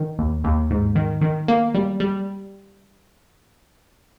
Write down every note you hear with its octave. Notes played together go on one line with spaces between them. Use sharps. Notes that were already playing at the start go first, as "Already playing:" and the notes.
Already playing: D#3
D#2
D#2
G#2
D#3
D#3
A#3
G3
G3